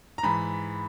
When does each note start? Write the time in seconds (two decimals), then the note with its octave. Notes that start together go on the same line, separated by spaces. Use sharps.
0.18 A#5
0.23 G#2 E3 B5